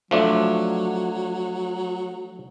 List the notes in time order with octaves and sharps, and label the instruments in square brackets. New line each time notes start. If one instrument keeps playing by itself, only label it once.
[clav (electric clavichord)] F3 A3 D4 [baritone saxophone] F#3